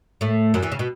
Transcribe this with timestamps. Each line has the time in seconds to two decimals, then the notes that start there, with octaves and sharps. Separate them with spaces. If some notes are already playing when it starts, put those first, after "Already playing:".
0.21 A2 A3
0.54 F#2 F#3
0.62 E2 E3
0.72 C#3
0.79 B2